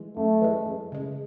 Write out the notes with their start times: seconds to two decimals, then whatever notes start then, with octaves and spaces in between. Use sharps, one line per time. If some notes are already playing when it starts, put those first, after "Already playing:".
Already playing: E3 G#3
0.17 F#2 A3
0.41 E3 G#3
0.66 F#2
0.92 C#3 G#3